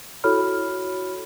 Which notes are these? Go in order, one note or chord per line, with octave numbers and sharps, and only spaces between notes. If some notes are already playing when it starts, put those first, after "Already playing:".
E4 F#4 A4 C#5 B5 F6